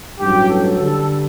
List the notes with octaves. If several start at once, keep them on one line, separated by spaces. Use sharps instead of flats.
A1 G2 F#3 G4
A4
G2 D3 G3 A4